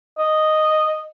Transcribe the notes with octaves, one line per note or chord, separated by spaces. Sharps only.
D#5